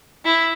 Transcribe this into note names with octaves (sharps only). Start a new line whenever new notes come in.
E4